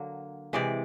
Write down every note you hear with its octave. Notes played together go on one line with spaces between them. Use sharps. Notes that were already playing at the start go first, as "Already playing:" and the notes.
Already playing: D3 F#3 A#3
C3 E3 G#3 D5